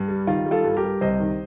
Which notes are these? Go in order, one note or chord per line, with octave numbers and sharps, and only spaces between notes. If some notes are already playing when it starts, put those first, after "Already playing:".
Already playing: G2
G3
D#3 F4
G3
F4 A4
G2
G4 A#4
G2
C2 C5 D#5
D#3